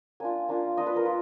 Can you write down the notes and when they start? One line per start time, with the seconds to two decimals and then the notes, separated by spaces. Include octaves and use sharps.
0.20 A#3 D4 F4 G#5
0.49 A#3 D4 F4
0.77 A#3 D4 F4 D#5
0.87 B4
0.96 A#4
1.06 F4